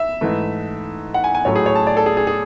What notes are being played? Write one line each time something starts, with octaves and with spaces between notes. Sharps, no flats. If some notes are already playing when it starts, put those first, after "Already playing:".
Already playing: E5
G#2 E3 A3
F#5
G#5
G#5
A2 F#3 A3 C#5
G#4
C#5
A5
D5
A4
G#4
G#4
G#4